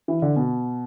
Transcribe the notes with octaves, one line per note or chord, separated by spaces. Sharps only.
E3
D3
B2